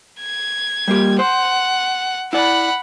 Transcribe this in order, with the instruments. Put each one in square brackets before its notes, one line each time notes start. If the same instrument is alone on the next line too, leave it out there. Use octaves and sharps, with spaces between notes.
[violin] G#6
[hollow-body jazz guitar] G3 A#3 G4
[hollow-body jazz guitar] C5 [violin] F#5
[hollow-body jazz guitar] E4 D5 [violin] F#5 B5